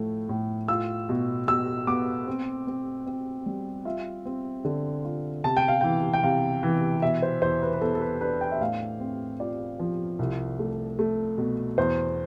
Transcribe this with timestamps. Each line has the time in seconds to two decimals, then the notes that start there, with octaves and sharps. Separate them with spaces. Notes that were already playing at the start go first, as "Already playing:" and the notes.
Already playing: A2 F3 A3
0.29 A2
0.68 F4 E6
1.09 B2
1.48 B2 E6
1.87 B3 D6
2.27 C4
2.67 C4
3.07 C4
3.46 G3
3.85 F4 E5
4.25 C4
4.65 D3
5.05 F4
5.44 C3 A5
5.57 G5
5.68 F5
5.81 E3 G5
6.14 G5
6.23 C3 F5
6.63 E3
7.02 B2 E5
7.22 C5
7.42 E2 C5
7.62 B4
7.73 B4
7.81 E2 A4
7.95 A4
8.01 B4
8.21 D4 B4
8.41 G5
8.52 E5
8.61 A2 F5
9.00 C4
9.40 F4 D5
9.79 F3
10.19 C2
10.59 A3
10.99 A3
11.38 B2
11.78 E2 C5